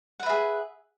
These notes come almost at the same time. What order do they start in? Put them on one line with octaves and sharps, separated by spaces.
F#5 B4 E5 G#4